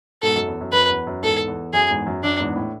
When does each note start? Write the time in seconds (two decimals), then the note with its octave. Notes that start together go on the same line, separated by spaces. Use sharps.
0.23 G#2 B2 A4
0.35 F#2
0.48 E2
0.61 F#2
0.72 F#2 B4
0.90 E2
1.07 F#2
1.23 E2 G#2 A4
1.48 E2
1.73 F#2 G#4
1.90 E2 G#2
2.06 F#2
2.23 F#2 D4
2.39 E2 G#2
2.56 A2